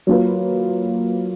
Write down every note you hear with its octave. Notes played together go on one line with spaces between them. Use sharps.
F#3 A#3 F4 B4